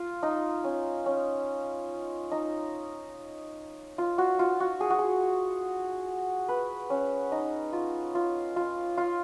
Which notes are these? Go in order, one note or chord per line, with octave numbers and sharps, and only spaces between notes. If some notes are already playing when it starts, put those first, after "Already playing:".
Already playing: F4
D#4
C#4
C#4
D#4
F4
F#4
F4
F#4
G#4
F#4
G#4
B4
C#4
D#4
F4
F4
F4
F4